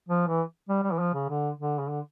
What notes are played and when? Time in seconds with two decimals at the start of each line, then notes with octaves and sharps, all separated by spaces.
0.09 F3
0.28 E3
0.69 G3
0.83 G3
0.92 E3
0.99 F3
1.14 C#3
1.29 D3
1.59 D3
1.79 C#3
1.89 D3